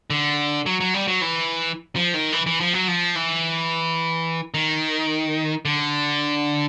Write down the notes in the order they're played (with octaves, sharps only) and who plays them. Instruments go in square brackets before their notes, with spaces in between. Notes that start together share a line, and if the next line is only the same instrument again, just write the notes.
[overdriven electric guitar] D3
F#3
F#3
G3
F#3
E3
F3
D#3
E3
E3
F3
F#3
F3
E3
D#3
D3